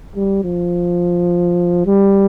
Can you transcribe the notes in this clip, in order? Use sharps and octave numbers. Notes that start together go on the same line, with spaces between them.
G3
F3
G3